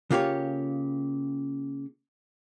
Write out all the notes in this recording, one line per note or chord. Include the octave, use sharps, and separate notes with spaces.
C#3 A#3 F4 G4 B4 C#5